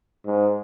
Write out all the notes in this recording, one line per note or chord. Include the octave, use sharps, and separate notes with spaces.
G#2